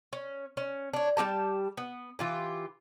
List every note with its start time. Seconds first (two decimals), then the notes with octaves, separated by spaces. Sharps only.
0.13 C#4
0.57 C#4
0.93 D4 C#5
1.17 G3 D#4 G4 A5
1.77 B3
2.19 E3 F4 G4